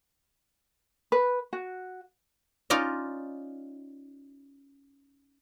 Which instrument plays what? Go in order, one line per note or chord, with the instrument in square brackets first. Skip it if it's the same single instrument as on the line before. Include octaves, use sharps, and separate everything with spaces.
[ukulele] B4
F#4
[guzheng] C#4 D#4 F4 D5 D#5